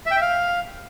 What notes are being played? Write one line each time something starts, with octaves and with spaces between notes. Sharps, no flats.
E5
G5
E5
F5